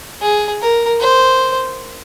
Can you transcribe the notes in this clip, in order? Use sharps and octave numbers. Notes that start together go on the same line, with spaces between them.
G#4
A#4
C5